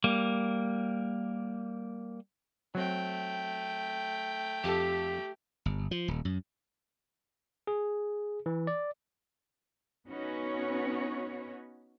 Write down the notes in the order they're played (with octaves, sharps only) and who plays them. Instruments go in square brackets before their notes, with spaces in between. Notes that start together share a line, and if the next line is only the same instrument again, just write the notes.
[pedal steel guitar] G3 A#3
[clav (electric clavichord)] F#3 C4 [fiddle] A3 G5
[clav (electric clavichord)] F2 A4 [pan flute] G4
[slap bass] G1
F3
D#1
F#2
[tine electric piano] G#4
E3
D5
[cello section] B3 C#4 D#4 F#4 B4 C#5